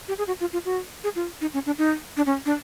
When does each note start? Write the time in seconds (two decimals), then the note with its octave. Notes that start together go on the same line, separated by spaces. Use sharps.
0.08 G4
0.18 G#4
0.27 F#4
0.40 F4
0.53 F4
0.65 F#4
1.04 G#4
1.16 F4
1.41 D#4
1.54 C#4
1.66 D4
1.78 D#4
2.17 D4
2.26 C#4
2.46 D4